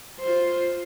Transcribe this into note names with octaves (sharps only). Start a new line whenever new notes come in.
F4 C5